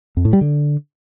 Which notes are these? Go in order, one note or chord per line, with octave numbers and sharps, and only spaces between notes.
F2
A2
G3
D3